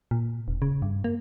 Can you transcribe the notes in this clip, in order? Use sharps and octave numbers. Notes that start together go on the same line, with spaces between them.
A#2
E1
C#3
G2
A#3